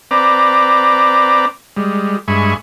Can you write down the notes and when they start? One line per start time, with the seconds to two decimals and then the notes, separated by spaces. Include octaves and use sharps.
0.11 C4 B4 D5 A#5 D6
1.77 G3 G#3
2.28 G2 G#3 E5 G#5 B5 C#6